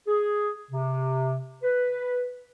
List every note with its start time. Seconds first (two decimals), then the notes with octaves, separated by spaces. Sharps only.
0.07 G#4
0.70 C3
1.63 B4